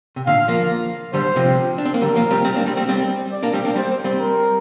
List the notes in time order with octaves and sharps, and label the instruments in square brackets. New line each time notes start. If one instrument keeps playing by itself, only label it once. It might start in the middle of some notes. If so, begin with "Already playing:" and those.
[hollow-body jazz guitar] C3
[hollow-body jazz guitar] A#2 D3 [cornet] F5
[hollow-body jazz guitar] F3 A#3
[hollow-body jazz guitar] D3 G3 [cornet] C5
[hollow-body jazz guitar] C3 F3
D4
C4
A#3
[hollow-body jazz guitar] D3 G3 [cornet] A#4
[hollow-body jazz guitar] F3 A#3
G3 C4
G3 C4
A#3 D4
G3 C4
G3 C4
G3 C4
[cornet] D5
[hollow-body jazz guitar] A#3 D4
G3 C4
A#3 D4
[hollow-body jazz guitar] G3 C4 [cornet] C5
[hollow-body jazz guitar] G3 C4
[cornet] A#4